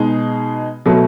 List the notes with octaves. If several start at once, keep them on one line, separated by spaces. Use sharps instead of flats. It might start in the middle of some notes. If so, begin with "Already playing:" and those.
Already playing: B2 G#3 D#4 G#4
B2 F#3 A3